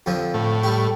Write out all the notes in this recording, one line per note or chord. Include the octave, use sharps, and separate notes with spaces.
F2 D3 F3
A2
G3 G4